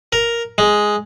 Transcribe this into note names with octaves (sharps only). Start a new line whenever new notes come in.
A#4
G#3